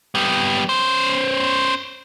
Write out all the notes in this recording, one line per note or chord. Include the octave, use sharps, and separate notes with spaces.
G3 B3
C#4 C5